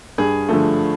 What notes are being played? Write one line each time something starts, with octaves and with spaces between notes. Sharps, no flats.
G2 G#4
D3 F3 A3